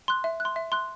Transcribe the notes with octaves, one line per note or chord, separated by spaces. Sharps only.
C6 F#6
E5
F#6
C6
E5
C6 F#6